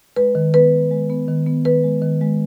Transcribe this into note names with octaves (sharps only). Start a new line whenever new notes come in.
G#3 B4
D#3
B3 B4
G#3
G#3
B3
D#3
B3
D#3 B4
G#3
D#3
G#3